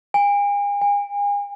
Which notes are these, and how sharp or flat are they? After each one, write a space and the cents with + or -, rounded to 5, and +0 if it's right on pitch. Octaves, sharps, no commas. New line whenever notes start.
G#5 -40
G#5 -35